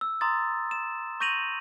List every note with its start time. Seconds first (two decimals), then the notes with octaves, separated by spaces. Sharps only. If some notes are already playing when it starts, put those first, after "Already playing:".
0.01 E6
0.21 A#5 C6 D#6 A6
0.71 E7
1.20 C#6 G6 A#6 D#7 F7 F#7